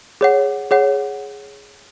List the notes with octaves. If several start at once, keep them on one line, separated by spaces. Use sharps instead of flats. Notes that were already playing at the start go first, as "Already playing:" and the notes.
G#4 C#5 F#5
G#4 C#5 F#5